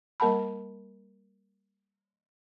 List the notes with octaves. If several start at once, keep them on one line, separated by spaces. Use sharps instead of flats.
G3 A#3 A#4 F#5 A5 B5